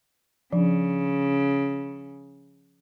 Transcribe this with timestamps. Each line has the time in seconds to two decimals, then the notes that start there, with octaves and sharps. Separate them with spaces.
0.52 C#3 F3 D4